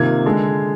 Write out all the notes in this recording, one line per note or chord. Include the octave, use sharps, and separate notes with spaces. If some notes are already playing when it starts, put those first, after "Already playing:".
Already playing: C3 D#3 A#3 F4 G#6
D3 G#3